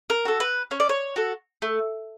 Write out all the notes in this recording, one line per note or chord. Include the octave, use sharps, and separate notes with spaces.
A#4
F#4 A4
B4
C#4 C#5
D5
C#5
F#4 A4
A3